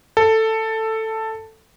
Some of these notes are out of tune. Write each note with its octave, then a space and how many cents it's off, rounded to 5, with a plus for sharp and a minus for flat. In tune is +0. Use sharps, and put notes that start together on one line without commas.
A4 +10